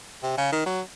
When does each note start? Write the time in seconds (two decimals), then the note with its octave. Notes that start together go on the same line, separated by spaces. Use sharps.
0.23 C3
0.37 C#3
0.52 D#3
0.66 F#3